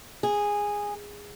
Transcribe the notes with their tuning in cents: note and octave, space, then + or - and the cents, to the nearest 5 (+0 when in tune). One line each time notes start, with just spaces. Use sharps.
G#4 -10